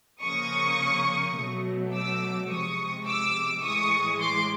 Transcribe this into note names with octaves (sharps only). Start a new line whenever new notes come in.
C#3 F3 A#3 C#6 D#6
B2 F#3 A3
D6 E6
C3 F3 G#3 C#6 D#6
D6 E6
A2 E3 G#3 C#6 D#6
C6 D6